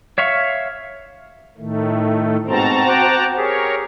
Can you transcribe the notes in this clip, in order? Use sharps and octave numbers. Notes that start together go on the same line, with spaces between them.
C#5 E5 F5 C#6
A2 D#3 A3
G#2 B2 C4 F#4 A5 A#5
G5 D6 F#6
G4 G#4 A#4 C#5